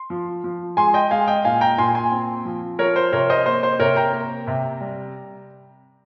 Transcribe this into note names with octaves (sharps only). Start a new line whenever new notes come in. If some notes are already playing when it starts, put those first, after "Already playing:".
Already playing: C6
F3
F3
G#3 G#5 C6
D#5 G5
G#3 F5 G#5
D#5 G5
A#2 F5 G#5
G5 A#5
A#2 G#5 C6
G#5 C6
C4
F3
F3 A#4 C#5
C5
C3 A#4 C#5
C5 D#5
A#3 C5
C5
C3 A#4 C#5
G5 A#5
A#3
C3
G3